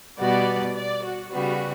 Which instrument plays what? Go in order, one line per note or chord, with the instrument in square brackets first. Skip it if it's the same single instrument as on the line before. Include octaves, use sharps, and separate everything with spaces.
[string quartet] B2 G3 B3 F#4 [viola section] D5
[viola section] D5
F#4
[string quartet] C#3 G3 B3 [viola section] F#4